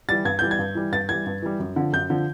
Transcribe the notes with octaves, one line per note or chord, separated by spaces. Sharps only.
E3 G3 A6
G2 G#6
E3 G3 G6
G#6
G2
E3 G3
G2 A6
E3 G3 G#6
G2
E3 G3
F#2
D3 F3
F#2 G6
D3 F3